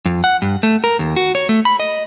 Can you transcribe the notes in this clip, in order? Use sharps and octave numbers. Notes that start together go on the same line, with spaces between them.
F2
F#5
G2
A3
A#4
D#2
F#4
C#5
A3
B5
D#5